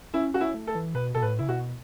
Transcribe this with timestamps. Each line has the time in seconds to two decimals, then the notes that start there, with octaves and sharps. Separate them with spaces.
0.14 C#4 E4
0.34 C#4 F#4
0.41 E4
0.54 A3
0.67 A4
0.75 E3
0.95 B2 B4
1.15 B2 A4
1.22 A2 B4
1.39 C#3 E4
1.48 B2 F#4